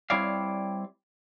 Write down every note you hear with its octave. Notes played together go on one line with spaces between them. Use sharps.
G3 C4 E4 C#5 D5 F5